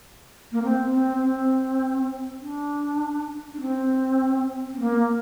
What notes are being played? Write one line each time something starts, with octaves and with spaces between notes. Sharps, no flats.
A#3
C4
C4
C4
D4
D4
C4
C4
A#3